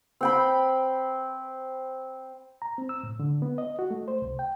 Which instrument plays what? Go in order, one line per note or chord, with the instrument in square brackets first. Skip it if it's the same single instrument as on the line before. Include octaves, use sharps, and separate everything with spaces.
[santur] C4 G5 B5
[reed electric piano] A#5
C4
E6
A2
D3
B3
D#5
F#4
A3
C5
C2
G5